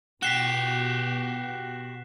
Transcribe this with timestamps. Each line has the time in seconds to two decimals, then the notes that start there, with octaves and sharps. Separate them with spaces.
0.22 B2 F#4 G4 F#6 B6 C7 E7 G7